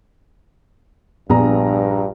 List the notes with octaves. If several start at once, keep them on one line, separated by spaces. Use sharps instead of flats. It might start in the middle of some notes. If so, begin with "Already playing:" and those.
A#1 G2 B3 D4 G#4 A#5